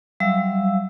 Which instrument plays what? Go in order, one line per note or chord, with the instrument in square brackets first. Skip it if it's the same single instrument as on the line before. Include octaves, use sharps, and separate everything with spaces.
[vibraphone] F#3 G3 E5 F5 E6